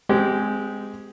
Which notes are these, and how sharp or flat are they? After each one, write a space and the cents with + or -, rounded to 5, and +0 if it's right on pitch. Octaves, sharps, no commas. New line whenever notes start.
G#3 +0 C4 -30 G4 -20